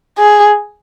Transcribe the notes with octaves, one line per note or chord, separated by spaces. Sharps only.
G#4